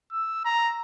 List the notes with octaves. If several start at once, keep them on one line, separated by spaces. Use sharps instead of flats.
E6
A#5